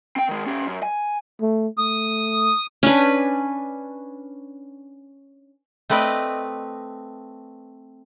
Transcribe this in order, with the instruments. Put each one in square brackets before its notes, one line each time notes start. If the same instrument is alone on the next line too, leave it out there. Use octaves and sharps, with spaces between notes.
[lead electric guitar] C4 G5
D#3 G#3
C#4 G4
F#2
G#5
[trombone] A3
[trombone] A3 [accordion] D#6
[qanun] C#4 D4 B4
[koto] A3 C4 B4 D5 D#5